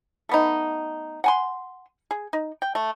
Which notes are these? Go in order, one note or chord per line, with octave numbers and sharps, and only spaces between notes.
A3 B3 D#4
F#5 G#5 C6
G#4
D#4
G5
A3